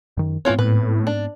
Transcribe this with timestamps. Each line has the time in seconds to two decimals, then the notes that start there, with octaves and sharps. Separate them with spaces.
0.17 F#2 D#3
0.45 G#2 E3 B3 C4 F4 C#5
0.59 A2 B4
1.07 D4